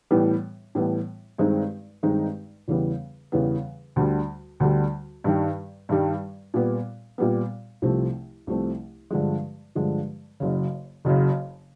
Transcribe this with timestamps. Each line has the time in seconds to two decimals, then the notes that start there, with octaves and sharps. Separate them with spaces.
0.11 A2 E3 G3 B3
0.75 A2 E3 G3 B3
1.38 G2 D#3 G#3 C4 D#4
2.03 G2 D#3 G#3 C4 D#4
2.68 E2 C#3 E3 G3 B3
3.32 E2 C#3 E3 G3 B3
3.96 D2 D3 G3
4.60 D2 D3 G3
5.24 G2 D#3 G3
5.89 G2 D#3 G3
6.54 A#2 G3 B3
7.18 A#2 G3 B3
7.82 C2 C3 F3 A3 C4
8.47 C2 C3 F3 A3 C4
9.11 G2 D3 F3 G#3
9.75 G2 D3 F3 G#3
10.40 F#1 F#2 C#3
11.05 F#1 F#2 C#3